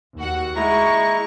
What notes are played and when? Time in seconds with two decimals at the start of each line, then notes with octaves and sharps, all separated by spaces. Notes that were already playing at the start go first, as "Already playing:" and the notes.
0.16 D#2 F#4 F#5
0.56 G#3 E4 A#5 C#6